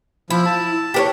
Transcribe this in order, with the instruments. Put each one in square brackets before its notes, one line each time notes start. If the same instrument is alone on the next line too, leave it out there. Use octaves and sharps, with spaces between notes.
[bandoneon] F3 [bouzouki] E4
[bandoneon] A5
[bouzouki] G4 A#4 C#5